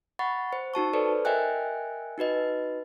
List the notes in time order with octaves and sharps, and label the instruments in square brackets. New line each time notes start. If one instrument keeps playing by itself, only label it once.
[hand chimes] F#5 B5 C#6 A6
C5
D#4 F#4 A5 C#6
A4 B4 C5 D5
A#4 D#5 E5 G5 G#5 F#6
D#4 F#4 B4 D#5